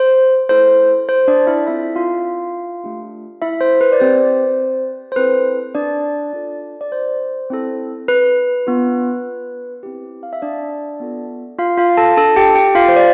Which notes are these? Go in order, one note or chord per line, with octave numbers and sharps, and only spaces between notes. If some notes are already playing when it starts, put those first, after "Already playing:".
Already playing: C5
A3 E4 A4 C5
C5
D4 D5
E4 E5
C4 E4 F4 A4 E5
F4 F5
A3 D4 G4
E4 E5
C5
B4
D5
C4 G4 C5
C5
C4 E4 A4 B4
D4 D5
D4 F4 A4
D5
C5
C4 E4 A4
B4
B3 D4 F4
C4 E4 G4
F5
E5
D4 D5
B3 F4 A4
F4 F5
F4 F5
A4 A5
D4 A4 A5
G4 G5
G4 G5
F4 F5
C5
D5